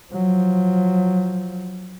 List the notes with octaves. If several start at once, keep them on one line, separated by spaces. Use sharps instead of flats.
F3 F#3